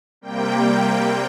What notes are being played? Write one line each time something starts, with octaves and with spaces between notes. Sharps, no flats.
C3 G3 A#3 G5